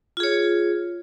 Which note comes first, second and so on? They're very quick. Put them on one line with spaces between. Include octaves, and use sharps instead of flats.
F4 G#4 C#5